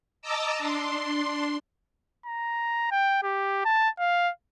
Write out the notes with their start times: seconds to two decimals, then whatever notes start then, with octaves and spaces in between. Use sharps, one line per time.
0.22 D#5 A5 A#5 D6 E6
0.58 D4 C6
2.26 A#5
2.91 G5
3.23 G4
3.65 A5
3.99 F5